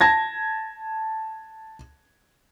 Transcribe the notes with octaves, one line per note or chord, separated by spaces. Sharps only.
A5 G#6 A#6